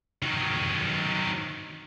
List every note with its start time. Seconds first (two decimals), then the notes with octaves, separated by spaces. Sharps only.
0.22 D#3 F#3